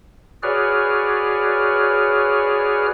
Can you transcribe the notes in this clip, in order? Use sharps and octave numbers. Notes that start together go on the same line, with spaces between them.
F#4 G#4 B4 C#5 D5 F6